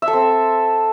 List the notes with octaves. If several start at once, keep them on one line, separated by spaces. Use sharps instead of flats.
E5
A4
C4